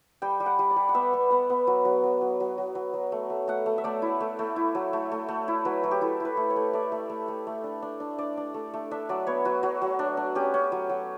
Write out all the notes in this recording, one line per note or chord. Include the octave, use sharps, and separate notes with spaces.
G3 G5
G3
F#5
G3
D5
G3
F#5
B3 E5
B3
B3 F#5
B3
F#3
F#3
F#3
F#3
F#3
F#3
F#3
F#3
A3
A3
A3 F#5
A3
E5
A3 D5
E4
A3
A3
E4
F#3
A3
A3
A3
E4
F#3 B4
F#3
G4
E4 A4
E4 B4
A3
C#5
A3
A3 D5
A3
A3
A3
A3
D4
D4
D4
D4 D5
D4
A3
A3
D4 E5
F#3 D5
B3 C#5
F#3 F#4
F#3
F#3
D4
D4
C#4 G4
C#4
F#3
F#3